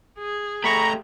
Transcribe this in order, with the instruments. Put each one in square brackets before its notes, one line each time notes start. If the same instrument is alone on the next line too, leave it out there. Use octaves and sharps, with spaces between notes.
[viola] G#4
[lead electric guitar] A3 G4 [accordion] A#5 [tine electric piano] B5 C#6